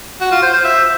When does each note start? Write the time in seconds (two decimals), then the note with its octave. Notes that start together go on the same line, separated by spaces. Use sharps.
0.21 F#4
0.32 F4
0.43 C5
0.53 C5
0.64 E5